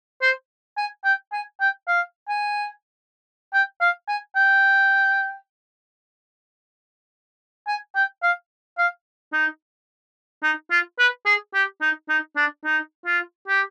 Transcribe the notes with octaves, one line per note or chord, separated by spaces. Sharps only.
C5
G#5
G5
G#5
G5
F5
G#5
G5
F5
G#5
G5
G#5
G5
F5
F5
D#4
D#4
F4
B4
G#4
G4
D#4
D#4
D4
D#4
F4
G4